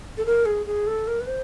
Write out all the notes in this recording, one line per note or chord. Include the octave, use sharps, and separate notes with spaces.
A4
A#4
G#4
G#4
A4
A#4
B4
C5